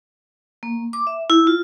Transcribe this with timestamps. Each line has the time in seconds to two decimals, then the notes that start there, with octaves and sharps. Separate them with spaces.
0.63 A#3
0.93 D6
1.07 E5
1.30 E4
1.47 F4